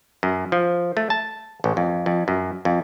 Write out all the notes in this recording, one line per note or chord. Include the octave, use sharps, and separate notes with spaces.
F#2
F3
A3
A5
A1
F2
F2
F#2
F2